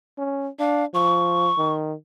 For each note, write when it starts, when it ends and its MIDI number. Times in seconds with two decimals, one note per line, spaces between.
0.18 0.48 61
0.59 0.84 62
0.59 0.85 77
0.94 1.50 53
0.94 1.74 85
1.58 1.94 51